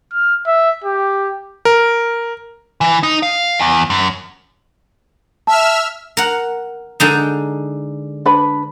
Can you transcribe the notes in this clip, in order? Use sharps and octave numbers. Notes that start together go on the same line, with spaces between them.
F6
E5
G4
A#4
E3
D#4
F5
E2
F#2
E5 A5 E6 F6
A#4 F#5
D3 G#3 D#4
D4 B4 B5